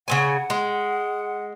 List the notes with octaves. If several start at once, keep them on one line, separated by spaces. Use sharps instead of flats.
C#3 C4 F#5 G#5
G#3